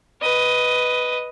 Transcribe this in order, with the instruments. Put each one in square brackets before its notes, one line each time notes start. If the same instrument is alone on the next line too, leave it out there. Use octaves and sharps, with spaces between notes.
[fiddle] B4 D#5